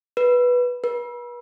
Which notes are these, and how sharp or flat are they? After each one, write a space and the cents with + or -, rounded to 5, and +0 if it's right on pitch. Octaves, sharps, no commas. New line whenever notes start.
B4 -10
B4 -40